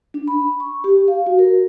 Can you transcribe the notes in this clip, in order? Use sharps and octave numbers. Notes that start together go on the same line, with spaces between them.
D4
B5
C#6
G4
F5
F#4
A#4